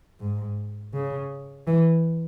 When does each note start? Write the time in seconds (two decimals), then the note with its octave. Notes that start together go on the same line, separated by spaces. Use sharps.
0.20 G#2
0.94 C#3
1.67 E3